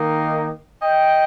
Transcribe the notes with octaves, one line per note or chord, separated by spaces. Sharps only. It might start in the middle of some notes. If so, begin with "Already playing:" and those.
Already playing: D#3 A#3 D#4
D#5 G5